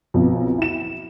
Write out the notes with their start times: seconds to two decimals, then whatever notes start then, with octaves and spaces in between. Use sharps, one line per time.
0.14 B1 F2 B2 F3
0.58 E4 E7